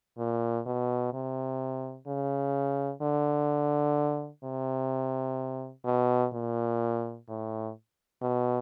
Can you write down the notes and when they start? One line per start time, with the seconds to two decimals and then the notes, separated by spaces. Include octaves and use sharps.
0.18 A#2
0.66 B2
1.13 C3
2.07 C#3
3.02 D3
4.44 C3
5.85 B2
6.33 A#2
7.28 A2
8.22 B2